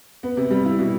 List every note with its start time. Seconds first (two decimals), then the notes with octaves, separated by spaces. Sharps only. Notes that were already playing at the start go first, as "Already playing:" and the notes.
0.23 B3
0.37 C3
0.51 G3
0.66 E4
0.79 B2